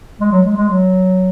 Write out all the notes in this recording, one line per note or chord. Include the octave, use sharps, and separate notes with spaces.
G#3
F#3
G#3
G#3
F#3